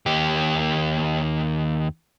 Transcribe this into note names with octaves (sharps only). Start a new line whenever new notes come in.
D#2 G4